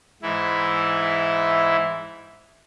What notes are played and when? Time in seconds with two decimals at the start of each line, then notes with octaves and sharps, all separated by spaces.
0.22 G#2 E3 E4